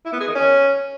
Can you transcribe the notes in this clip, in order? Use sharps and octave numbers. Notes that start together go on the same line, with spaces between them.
E4
B3
G#4
D#3
C#4